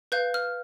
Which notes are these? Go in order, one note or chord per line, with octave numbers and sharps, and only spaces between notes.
B4 F5 G6
F6